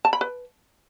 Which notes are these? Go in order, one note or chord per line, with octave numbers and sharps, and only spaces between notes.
A5
B5
B4